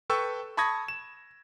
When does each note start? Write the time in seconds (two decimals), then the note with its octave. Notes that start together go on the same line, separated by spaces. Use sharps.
0.10 A4 B4 G5 C#6 E6
0.57 A5 B5 C#6 D#6 G#6 A#6
0.88 E7